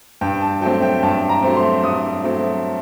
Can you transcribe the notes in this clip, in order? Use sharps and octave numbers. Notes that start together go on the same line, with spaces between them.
G2 G5
A5
F#3 A3 C4 G5
G5
G2 A5
A#5
F#3 A3 C4
C6
G2 D#6
F#3 A3 C4